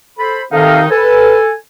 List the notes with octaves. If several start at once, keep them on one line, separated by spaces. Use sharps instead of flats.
A4 C5 B5
C3 D#3 D#4 A4 F5
A4 B4 G#5